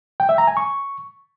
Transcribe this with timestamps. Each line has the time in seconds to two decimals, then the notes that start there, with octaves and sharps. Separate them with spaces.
0.20 G5
0.29 E5
0.38 A#5
0.47 G#5
0.57 C#6